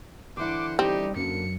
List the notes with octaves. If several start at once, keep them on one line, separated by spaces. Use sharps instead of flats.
D3 E3 E4 C5 F#5 D6
G3 C4 D#4 G4
F#2 D3 A#3 C#7